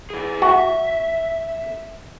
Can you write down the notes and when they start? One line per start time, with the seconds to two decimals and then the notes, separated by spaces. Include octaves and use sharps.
0.10 E4 G#4
0.42 F#4 E5